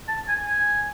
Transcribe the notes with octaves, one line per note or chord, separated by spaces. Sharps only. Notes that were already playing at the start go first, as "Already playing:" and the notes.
A5
G#5
G#5